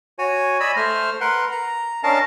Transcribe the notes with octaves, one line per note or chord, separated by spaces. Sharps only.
F#4 C#5 G#5
D5 D#5 G#5 B5 E6
A3 C5 F6
A#4 B4 F#5 C6
A#5
C#4 D4 A#4 D#5 F5 A5